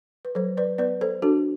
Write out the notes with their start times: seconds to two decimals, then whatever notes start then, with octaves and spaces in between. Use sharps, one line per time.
0.25 B4
0.35 F#3 A4 C5
0.57 B4 D5
0.78 B3 B4 D5
1.01 A4 C5
1.22 D4 F#4 A4